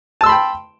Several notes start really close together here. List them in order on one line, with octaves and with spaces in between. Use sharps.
A5 E6 C6 B5 G5